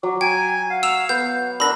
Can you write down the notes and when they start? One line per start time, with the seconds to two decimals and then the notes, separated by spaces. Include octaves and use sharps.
0.03 F#3 D6
0.21 G5 G#5 A#5
0.70 F5 F#5
0.83 E6 E7 F7
1.09 B3 F#5 G6
1.60 D4 A#4 F#5 A#5 B5 E6 A#6